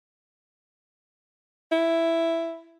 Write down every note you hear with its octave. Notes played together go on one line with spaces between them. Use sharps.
E4